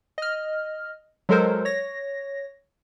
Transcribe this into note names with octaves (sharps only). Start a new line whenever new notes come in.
D#5 F6
F#3 G#3 A4 A#4 C5
C#5 A#6